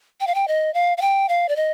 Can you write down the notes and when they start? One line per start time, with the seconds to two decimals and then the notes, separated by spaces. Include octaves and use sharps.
0.21 G5
0.27 F5
0.35 G5
0.48 D#5
0.74 F5
0.97 F5
1.02 G5
1.29 F5
1.49 D5
1.56 D#5